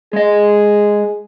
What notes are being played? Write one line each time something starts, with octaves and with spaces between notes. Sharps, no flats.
G#3 G#4 D#5